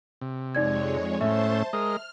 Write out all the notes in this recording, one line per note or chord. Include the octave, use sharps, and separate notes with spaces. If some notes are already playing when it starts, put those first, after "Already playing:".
C3
F2 G#3 D#4 C#5 D5 G#6
A2 A3 C#4 C5 E5 A5 C6
G#3 A#4 D#5 F6